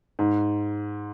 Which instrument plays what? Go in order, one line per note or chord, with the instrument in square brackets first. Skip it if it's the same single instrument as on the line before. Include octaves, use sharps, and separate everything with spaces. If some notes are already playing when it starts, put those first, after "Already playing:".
[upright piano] G#2